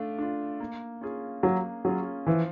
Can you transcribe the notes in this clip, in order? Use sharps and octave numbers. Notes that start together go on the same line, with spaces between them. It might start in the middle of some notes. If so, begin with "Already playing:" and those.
Already playing: A3 D4 F4
D4 F4
A#3
C#4 F4 G#4
F#3 A#3
F#3 C#4 F4 G#4
E3 F3